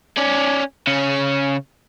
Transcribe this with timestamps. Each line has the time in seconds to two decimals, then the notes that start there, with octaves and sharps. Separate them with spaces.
0.18 C#4 D5
0.87 C#3 C#4